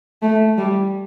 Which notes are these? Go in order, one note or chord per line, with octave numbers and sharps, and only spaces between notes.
A3
G3